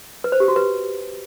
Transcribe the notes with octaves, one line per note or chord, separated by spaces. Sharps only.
B4
C5
G4
F#4
B4